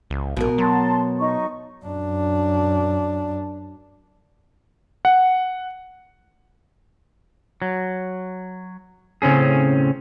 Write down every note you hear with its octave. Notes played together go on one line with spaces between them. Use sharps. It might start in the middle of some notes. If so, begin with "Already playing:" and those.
C#2
A#1 B2 A#4
F#3 A5 A#5 C6
D#4 C#6
F#2 D4
F#5
F#3
A2 C#3 C4 C#4 G#4